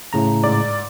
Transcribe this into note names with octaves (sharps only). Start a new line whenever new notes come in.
A2 C#3 A#5
G#2 D5